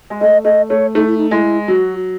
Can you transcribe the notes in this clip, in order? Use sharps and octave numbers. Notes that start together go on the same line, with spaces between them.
G#3
A3 D#5
A3 D#5
A3 C#5
A3 D#4
E4
D#4
G#3 E4
F#3 F#4